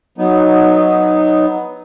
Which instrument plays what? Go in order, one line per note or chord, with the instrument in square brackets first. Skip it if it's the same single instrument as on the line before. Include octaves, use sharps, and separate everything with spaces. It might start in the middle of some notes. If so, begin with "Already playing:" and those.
[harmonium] F#3 B3 D#4